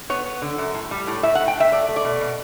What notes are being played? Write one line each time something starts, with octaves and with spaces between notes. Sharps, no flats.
B3 C#5
B3
D3
F#2
A2
G3
A2
A2 E5
F#5
A2
G5
A2 E5
A3 D5
A3
D5
B2
B2